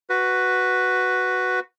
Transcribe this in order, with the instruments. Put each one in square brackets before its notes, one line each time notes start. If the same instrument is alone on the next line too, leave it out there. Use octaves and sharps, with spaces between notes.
[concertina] F#4 B4